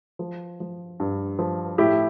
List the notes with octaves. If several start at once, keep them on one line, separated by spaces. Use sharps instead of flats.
F3
F3
G2
F3
A2 E4 G4